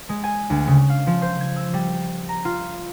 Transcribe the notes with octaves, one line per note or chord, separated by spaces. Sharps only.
G#3
G#5
D2
C#3
F5
F3
C5
G#6
E6
G3
A#5
F4